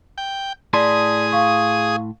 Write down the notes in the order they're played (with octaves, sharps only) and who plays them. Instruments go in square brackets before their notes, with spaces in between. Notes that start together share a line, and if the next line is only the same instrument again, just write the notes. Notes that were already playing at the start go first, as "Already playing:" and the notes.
[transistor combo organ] G5
[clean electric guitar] A2 E4 C6 [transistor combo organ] G#4 D#6 [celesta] D5 A5
[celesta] F5 C#6